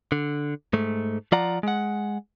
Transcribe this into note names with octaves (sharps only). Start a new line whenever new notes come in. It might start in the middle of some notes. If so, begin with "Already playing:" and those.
D3
G#2 A3
F3 F4 D5 F#5 A#5
G#3 F#5